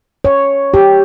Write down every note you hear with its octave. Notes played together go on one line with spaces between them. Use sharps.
C#5
G4